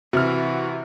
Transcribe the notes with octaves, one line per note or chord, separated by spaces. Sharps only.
C3 E3 F#4 F6